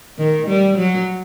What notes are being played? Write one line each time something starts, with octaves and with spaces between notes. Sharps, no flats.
D#3
G3
F#3